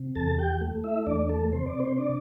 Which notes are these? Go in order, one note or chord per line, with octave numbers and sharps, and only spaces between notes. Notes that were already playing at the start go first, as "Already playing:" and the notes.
Already playing: C3
E2 A4 A5
G4 G5
A3
E4 E5
E2 D4 D5
A3 A4
C3 C5
D5
C4 C5
D4 D5